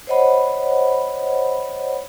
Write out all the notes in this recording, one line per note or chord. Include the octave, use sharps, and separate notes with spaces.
C5 C#5 D#5 F#5 B5